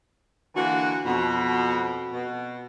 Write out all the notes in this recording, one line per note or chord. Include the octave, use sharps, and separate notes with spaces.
D3 E3 A#3 F#4
F2 B2
B2